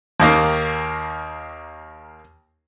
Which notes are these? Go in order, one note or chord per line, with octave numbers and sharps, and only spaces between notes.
D#2 D#3 A#3